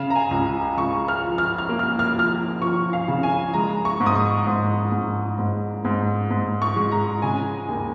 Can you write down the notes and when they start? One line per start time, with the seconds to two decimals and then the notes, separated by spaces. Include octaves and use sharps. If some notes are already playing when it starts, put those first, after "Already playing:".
Already playing: C#3 F5
0.10 A#5
0.15 G#5
0.31 C#2
0.77 C#2 C#6
1.08 F6
1.24 F3
1.38 F6
1.58 F6
1.69 A#3
1.79 F6
1.99 F6
2.16 F3 F6
2.61 F3 C#6
2.93 F5
3.08 C#3
3.23 G#5
3.53 G#3 A#5
3.85 C#6
4.00 G#2
4.06 D#6
4.15 C#6
4.47 G#2
4.92 G#2
5.39 G#2
5.85 G#2
6.31 G#2
6.62 C#6
6.76 G#3
6.91 A#5
7.22 C#3 G#5
7.69 D#2